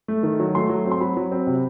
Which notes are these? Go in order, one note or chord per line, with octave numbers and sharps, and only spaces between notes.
A3
D#3
F#3
A3 C6
F#3
C4
C6
F#3 B5
F#3
C4
C3